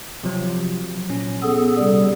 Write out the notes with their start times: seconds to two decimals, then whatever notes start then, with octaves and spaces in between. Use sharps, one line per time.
0.24 C3 F3 F#3
1.09 A#2 C#4
1.43 B3 G#4 A4
1.78 C3 G3